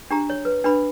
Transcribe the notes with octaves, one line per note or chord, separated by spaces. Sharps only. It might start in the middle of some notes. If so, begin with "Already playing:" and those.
D4 G4 A#5
C#5
B4
D4 B4 B5